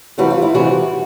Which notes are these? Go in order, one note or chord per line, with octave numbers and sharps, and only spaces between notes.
F2 C3 E3 G3 F#4
F4
E4
F2 C3 E3 G3 F#4